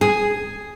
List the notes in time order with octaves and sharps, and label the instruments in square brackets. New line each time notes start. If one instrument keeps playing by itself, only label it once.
[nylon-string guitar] G#4